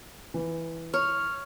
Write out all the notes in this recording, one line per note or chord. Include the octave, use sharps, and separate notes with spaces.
E3
C#5 F6